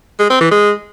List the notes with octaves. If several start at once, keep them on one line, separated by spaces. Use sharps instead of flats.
G#3
C4
E3
G#3